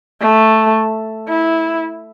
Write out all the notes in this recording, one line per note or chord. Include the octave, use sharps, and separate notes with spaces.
A3
E4